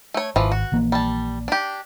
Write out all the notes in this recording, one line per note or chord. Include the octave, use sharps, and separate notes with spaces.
A3 C#5
G#1 E3 F3
F#4
A#1 E3 A#3
G3 A5
D4 G4